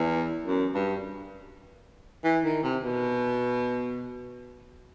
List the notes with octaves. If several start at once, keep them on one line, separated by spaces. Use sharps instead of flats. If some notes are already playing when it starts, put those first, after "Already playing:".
Already playing: E2
F#2
G2
E3
D#3
C3
B2